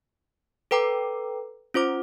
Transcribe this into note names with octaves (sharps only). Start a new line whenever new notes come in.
A4 B4 G5 A#5 D6
C#4 F4 C5 D6